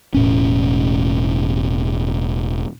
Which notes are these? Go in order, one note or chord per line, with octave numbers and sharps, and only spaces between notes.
E1 A2 C#4